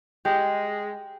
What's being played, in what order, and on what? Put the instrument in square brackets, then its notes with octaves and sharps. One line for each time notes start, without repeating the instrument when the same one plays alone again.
[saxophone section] G#3 [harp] G4